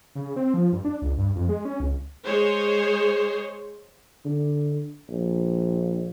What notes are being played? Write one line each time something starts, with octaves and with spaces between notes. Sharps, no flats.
C#3
C4
F3
G2
D4
C#2
G2
F2
G#3
C#4
C#2
G#3 G#4 C5 C#5
D3
A#1